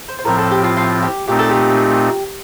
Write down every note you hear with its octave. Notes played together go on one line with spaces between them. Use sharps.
C5
C5
A2 F3 C4 A#4
A4
G4
F4
F4
G4
A#2 A3 C4 D#4 G4
A4
G4